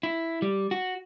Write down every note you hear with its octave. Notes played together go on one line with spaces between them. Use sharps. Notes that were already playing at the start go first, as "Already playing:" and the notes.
E4
G3
F#4